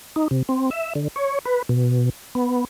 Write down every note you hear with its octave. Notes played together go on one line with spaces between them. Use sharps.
D#4
C3
C4
E5
D3
C#5
B4
B2
B3